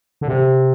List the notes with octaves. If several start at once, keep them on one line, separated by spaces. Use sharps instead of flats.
D3
C3